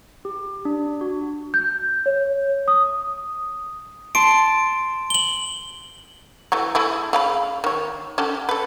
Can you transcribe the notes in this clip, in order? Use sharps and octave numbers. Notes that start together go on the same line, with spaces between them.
G4
D4
F#4
G6
C#5
D#6
A5 C6 D7
F#7 G7
E3 F#3 A3
A3 E4 G#4
C#3 F5 B5
D#3 C#5
D3 C#4 G4
A4 B4